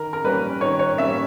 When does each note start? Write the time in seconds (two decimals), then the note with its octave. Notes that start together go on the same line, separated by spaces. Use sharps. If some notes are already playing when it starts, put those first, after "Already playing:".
Already playing: D#3 A#4
0.13 A#4
0.24 G3 A#3 C#4 B4
0.61 D#3 C#5
0.79 C#5
0.98 G3 A#3 C#4 E5